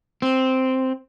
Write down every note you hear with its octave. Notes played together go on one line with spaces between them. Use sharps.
C4